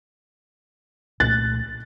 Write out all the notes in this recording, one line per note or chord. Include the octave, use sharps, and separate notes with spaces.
C2 A#2 A3 F#6 A6